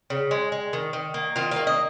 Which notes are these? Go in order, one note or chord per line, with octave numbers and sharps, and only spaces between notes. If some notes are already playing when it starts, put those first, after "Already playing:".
C#3
G#3
G#3
D#3
D#3
A#3
D#3 F4
A#3 F5
D#5